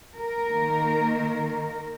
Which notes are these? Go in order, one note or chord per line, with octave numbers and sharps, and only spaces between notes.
A#4
D#3 A#3